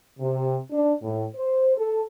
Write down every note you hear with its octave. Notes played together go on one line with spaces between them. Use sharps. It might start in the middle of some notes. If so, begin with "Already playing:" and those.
C3
D4
A2
C5
A4